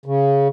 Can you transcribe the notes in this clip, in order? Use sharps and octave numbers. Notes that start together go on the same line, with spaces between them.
C#3